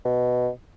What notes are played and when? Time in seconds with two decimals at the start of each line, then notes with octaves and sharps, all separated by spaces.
0.05 B2